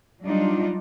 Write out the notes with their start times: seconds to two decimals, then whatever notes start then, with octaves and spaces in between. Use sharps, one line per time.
0.22 F#3 G3 D4 D#4 F4